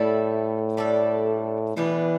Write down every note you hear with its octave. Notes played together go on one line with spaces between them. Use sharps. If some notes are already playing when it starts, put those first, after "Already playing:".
Already playing: A2 G3 E4 A4
G3 D4 A4
B2 E3 G3 B3 D4